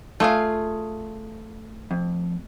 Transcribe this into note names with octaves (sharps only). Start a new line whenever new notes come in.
A3 F4 G#4 F5
F2